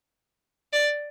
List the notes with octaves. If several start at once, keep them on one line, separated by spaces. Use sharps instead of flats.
D5